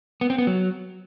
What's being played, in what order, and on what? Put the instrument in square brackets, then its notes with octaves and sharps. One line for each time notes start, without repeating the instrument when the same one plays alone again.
[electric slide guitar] B3
C4
B3
F#3